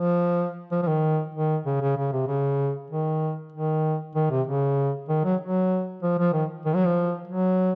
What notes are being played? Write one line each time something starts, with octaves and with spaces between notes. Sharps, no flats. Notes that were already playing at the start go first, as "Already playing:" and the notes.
Already playing: F3
F3
F3
D#3
D#3
C#3
C#3
C#3
C3
C#3
D#3
D#3
D#3
C3
C#3
D#3
F#3
F#3
F3
F3
D#3
D#3
F#3
F3
F#3